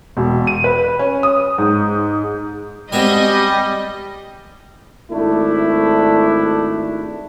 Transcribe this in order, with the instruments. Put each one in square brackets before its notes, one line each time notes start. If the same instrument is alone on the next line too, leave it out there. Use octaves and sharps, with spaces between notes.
[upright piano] E1
D#7
B4
C#4
D#6
G#2
[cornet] G3 [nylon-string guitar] G#3 B3 C4 [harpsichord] F#4 G4 G#5 [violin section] D#5
[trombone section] G#1 A3 D4 E4